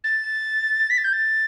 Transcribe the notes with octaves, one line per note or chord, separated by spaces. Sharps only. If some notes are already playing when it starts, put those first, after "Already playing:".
A6
B6
A6
G6
A6